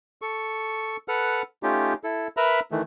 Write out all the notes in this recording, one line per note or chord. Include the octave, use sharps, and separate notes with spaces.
A4 C#6
A4 B4 F#5 F6
A3 C#4 D#4 F4 G4
E4 A4
A#4 B4 E5 A#5 B5
D#3 E3 A3